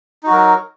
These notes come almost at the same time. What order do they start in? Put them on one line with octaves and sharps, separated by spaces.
D#4 F#4 F#3 A#4